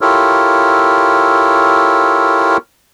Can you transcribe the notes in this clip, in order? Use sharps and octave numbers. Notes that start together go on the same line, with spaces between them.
E4 F4 G4 A4 A#4 C#5